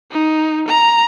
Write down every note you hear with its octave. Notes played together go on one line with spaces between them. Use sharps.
D#4
A#5